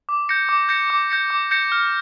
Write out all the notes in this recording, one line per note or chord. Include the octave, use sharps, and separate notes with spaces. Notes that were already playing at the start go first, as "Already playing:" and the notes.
D6
G6 A#6 C#7
D6
G6 A#6 C#7
D6
G6 A#6 C#7
D6
G6 A#6 C#7
F6